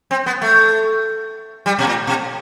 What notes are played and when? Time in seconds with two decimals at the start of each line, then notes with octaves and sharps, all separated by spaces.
0.11 C4
0.26 B3
0.42 A3
1.66 G3
1.79 B2
1.87 A2
2.07 B2